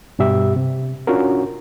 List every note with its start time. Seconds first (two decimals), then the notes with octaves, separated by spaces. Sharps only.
0.19 G2 B2 G3 G4 E5
0.56 C3
1.07 C#4 D4 F4 F#4 A#4